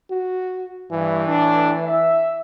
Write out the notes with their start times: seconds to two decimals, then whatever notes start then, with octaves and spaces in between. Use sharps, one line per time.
0.10 F#4
0.92 G2 E3
1.27 A2 D4
1.84 E5